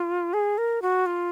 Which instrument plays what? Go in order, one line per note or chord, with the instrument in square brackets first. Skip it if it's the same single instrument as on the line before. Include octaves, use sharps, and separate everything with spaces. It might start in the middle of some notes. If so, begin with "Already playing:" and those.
Already playing: [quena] F4
G#4
A#4
F#4
F4